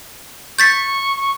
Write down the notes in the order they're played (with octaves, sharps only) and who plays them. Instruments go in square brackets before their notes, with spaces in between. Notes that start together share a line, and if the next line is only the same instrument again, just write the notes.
[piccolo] C#6 [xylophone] G6 A6 B6